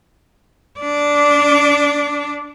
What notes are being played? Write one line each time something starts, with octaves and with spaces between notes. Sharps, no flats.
D4 D5